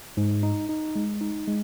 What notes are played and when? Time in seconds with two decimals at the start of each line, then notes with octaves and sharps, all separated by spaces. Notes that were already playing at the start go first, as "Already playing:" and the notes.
0.17 G#2
0.43 D#4
0.69 D#4
0.96 G#3
1.21 D#4
1.48 G#3